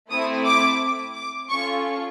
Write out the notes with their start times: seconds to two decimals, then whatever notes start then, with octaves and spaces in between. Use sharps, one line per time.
0.11 A3 C4 E4 D#6
0.45 D6
1.14 D6
1.50 C#4 F4 A4 C#6